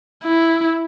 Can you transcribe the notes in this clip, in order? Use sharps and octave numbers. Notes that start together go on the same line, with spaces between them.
E4